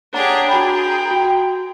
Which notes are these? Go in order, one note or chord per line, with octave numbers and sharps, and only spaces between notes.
D4 G4 G#4 C#5 F#5 A#5
F#4 G#4 A#4 G5 B5
F#4